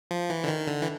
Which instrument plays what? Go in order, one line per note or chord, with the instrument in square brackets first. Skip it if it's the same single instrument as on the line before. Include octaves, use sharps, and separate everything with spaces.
[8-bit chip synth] F3
E3
D3
D#3
D3
E3